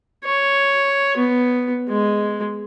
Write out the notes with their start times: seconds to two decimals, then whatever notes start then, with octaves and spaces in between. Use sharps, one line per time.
0.24 C#5
1.17 B3
1.89 G#3